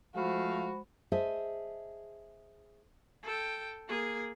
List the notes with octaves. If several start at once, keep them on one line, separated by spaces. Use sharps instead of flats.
F3 G#3 A3 F#4 C5 F5 B5
G#4 C5 D#5 E5 A5
A4 G5
A#3 G#4